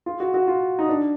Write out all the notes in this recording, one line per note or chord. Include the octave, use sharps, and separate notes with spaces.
F4
F#4
F#4
F4
D#4
D4